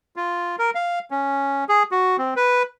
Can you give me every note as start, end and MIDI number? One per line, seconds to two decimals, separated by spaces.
0.16 0.56 65
0.59 0.70 70
0.75 0.99 77
1.11 1.64 61
1.69 1.83 68
1.91 2.17 66
2.18 2.34 60
2.36 2.63 71